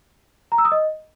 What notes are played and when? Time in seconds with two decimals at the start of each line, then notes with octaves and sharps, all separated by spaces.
0.52 A#5
0.58 E6
0.65 D#6
0.72 D#5